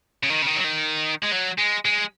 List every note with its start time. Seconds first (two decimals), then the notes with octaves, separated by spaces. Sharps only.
0.23 C#3
0.30 D#3
0.42 C#3
0.47 D#3
0.57 F#3
0.64 D#3
1.24 G#3
1.33 F#3
1.59 G#3
1.85 G#3